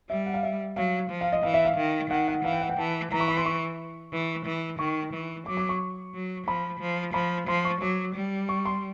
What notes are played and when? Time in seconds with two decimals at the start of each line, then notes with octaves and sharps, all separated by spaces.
0.10 G3 E5
0.26 F#5
0.34 F5
0.43 E5
0.76 F#3 F5
1.11 F3
1.21 F5
1.32 D#5
1.43 E3 F5
1.54 E5
1.65 F5
1.77 D#3
2.10 D#3 F#5
2.28 F#5
2.44 E3 F5
2.53 G5
2.61 F#5
2.70 G5
2.78 E3 A5
3.12 E3 A#5
3.20 C#6
3.28 B5
3.37 C6
3.46 C#6
4.12 E3
4.46 E3
4.79 D#3 C#6
5.13 E3
5.46 F#3 D6
5.57 D6
5.69 C#6
6.14 F#3
6.47 F3 B5
6.80 F3
7.14 F3 B5
7.47 F3 C6
7.65 C#6
7.81 F#3 D6
8.15 G3
8.49 C#6
8.65 C6